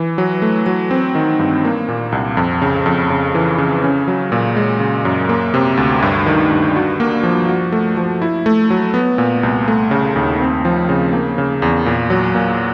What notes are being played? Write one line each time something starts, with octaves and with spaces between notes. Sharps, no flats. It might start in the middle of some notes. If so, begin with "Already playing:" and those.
Already playing: E3
F#3
A3
F#3
C4
D#3
G2
A#3
A#2
C2
F2
C#3
F2
C#3
E3
C#3
C#4
F#3
A#2
G#3
C#3
F#2
A#3
C3
D2
G2
D#3
G2
F#4
A#3
F3
F#4
A3
F3
E4
A3
F#3
B3
A#2
C2
A3
C#3
D#2
C4
F3
C#3
A#3
C#3
E2
A#2
F#3
A#2